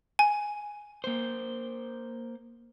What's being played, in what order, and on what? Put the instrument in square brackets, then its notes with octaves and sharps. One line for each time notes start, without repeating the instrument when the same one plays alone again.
[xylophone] G#5
[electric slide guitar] A#3 C5